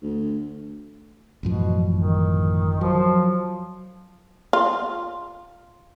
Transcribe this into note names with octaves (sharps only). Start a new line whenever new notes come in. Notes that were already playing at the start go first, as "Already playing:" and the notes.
D2
A1 F#2 B2 F3
D#3
F3 F#3
F4